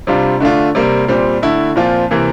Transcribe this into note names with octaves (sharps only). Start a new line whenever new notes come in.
C3 G3 D4 F4
D3 A3 D4 F4
C3 G3 A#3
A#2 G3 C4
D3 A3 E4
A#2 F3 C4 F4
C3 E3 A#3